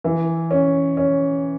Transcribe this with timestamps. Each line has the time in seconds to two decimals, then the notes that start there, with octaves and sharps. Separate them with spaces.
0.04 E3
0.51 C#4
0.97 C#4